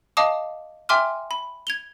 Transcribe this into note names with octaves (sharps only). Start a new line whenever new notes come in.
D#5 F5 A5 D6 D#6
E5 G5 G#5 C6 D6 F6
B5
G#6 F7 G7